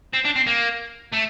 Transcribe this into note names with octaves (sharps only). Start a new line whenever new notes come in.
C4
D4
C4
A#3
A3